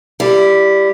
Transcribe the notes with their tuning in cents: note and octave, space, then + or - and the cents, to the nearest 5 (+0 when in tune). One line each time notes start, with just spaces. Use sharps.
G3 +0 E4 +20